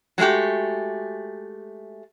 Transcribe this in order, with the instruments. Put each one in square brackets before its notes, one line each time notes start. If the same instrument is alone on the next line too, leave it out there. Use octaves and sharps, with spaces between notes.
[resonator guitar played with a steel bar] F#3 G#3 A3 F#4 G4